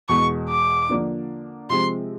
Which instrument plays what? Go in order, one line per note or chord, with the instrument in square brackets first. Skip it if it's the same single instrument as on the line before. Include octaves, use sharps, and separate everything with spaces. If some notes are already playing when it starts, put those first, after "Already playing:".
[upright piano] E2 B2 G#3 [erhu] C#6
[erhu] D6
[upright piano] D3 F3 A#3 D4
[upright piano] C3 F3 G#3 C4 [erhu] C6